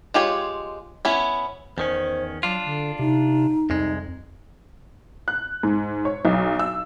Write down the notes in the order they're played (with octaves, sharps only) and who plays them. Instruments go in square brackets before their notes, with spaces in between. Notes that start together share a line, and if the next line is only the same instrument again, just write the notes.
[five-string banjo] G#3 F4 G4 C#5
B3 C#4 E4
[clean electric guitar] E2 D#3 C#4 [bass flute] C5
[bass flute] F#3 [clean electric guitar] D4 F4
[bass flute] D3
[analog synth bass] C3 [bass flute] D#4
[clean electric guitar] C2 G#3 [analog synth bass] F2
[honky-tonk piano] F#6
G#2
C#5
B1
E6